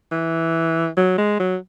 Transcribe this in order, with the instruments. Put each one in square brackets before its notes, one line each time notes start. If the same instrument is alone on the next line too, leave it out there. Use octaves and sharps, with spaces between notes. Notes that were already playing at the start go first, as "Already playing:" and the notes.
[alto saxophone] E3
F#3
G#3
F#3